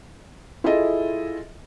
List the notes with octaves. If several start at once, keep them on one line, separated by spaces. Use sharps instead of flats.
E4 F4 G#4 A4 D#5 E5